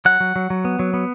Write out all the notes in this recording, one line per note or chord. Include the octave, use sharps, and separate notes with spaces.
F#3 F#5
F#3
F#3
F#3
B3
F#3
B3